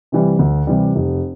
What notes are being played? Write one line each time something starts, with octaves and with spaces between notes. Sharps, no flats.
C3 E3 G3
D2
C3 E3 G3
F1